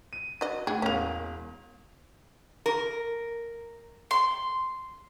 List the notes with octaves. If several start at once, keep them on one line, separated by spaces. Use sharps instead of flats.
D#7
F#4 D#5
A2 G#4 F#5 G5
E1 A#3 C#4 F7
A#4
C6